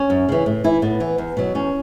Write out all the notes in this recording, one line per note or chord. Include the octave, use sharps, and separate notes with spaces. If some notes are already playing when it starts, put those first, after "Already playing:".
Already playing: C#4
F#2
C#3 E3
A2
E3 E4
A2 B3
E3
E2
B2 F#3
E2 C#4